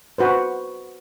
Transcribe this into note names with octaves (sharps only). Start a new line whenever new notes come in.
F#4 B4 C5